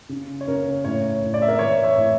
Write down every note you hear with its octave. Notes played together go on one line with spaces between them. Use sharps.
C#3
C#5
C#3 A#4
A2 C#5
A2
D5
E5
A#4 D5
E3 C#5 E5
C#5 E5
A2